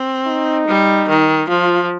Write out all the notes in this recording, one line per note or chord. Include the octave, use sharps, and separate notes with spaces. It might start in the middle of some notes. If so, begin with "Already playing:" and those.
Already playing: C4
D#4
G3
D#3
F3 F4